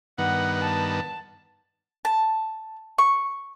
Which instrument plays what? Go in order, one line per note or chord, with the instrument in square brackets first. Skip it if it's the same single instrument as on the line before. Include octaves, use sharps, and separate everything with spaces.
[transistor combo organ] G2 D#3 B3 [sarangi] F#5
[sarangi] A5
[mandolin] A5
C#6